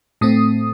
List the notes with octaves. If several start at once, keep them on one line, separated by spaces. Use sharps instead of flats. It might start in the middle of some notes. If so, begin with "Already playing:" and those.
A2 A3 C4 D#6